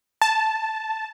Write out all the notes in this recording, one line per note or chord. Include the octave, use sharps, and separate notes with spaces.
A5